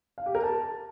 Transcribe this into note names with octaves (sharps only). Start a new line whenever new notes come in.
F5
G4
A#4
A5